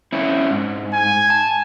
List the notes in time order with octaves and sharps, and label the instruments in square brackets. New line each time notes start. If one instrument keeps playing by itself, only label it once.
[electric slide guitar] C4 C#4 E4
G#2
[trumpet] G#5
[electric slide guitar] A5